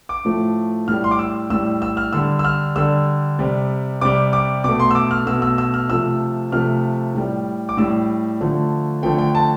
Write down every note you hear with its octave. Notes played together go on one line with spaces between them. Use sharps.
D6
A2 F3 A3
A2 G3 F6
C6
D6
E6
A2 G3 E6
E6
F6
D3 G3 E6
E6
F6
D3 G3 E6
C3 G3
C3 G3 D6
D6
B2 A3 D6
C6
E6
D6
F6
B2 A3 E6
E6
E6
F6
C3 F3 A3 E6
C3 F3 A3 F6
A2 G3
D6
A2 G3 E6
D3 F3 A3
D3 F3 A3 G5
G5
A5